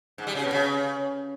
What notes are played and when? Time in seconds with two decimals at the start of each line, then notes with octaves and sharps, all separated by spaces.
0.18 G#2
0.27 G3
0.35 C#3
0.44 B2
0.52 C#3